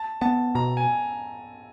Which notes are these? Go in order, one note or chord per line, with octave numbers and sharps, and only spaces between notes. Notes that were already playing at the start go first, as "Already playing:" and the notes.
Already playing: A5
B3 A5
B2 A#5
G#5